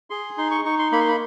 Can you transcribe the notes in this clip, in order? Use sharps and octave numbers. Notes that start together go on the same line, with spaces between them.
G#4 C6
D#4 C6
C#6
D#4 C#6
C6
A#3 B5
C6
B5